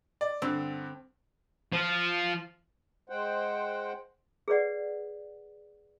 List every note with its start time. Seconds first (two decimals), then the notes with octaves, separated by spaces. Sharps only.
0.21 D5
0.42 G2 D3 C4
1.72 F3
3.09 G#3 C5 F#5 G5
4.48 G#4 B4 C#5 D5 F#5